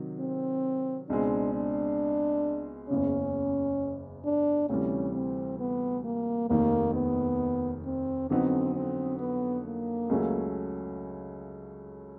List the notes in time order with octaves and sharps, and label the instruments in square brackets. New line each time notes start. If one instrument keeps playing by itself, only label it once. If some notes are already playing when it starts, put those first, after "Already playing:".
Already playing: [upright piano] C3 D#3 F#3
[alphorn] C4
[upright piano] C#2 B2 G#3 C4 [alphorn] D4
[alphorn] D4
[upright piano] F#1 E2 C#3 [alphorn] C#4
[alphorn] D4
[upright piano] D2 C3 E3 G3 [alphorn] C#4
[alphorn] C4
B3
A#3
[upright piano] F1 D#2 D#3 [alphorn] A#3
[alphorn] B3
C4
[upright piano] F2 D3 F#3 B3 D#4 [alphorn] C4
[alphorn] C4
B3
A#3
[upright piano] C#2 C#3 F#3 A3 C#4